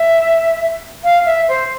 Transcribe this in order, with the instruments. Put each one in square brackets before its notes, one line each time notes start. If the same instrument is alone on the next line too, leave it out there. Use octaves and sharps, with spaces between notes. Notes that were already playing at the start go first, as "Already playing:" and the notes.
Already playing: [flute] E5
F5
E5
C5